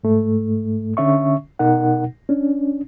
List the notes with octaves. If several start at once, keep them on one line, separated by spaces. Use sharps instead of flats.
G#2 A3
D3 C#4 E5 C#6
B2 D#4 A#4 F#5
C#4 D4